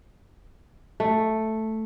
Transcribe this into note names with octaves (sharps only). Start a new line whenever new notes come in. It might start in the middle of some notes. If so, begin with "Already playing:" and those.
A3